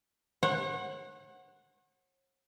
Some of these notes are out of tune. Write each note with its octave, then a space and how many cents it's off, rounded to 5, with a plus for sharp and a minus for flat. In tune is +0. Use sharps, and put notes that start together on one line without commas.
C#5 -45 F#5 +0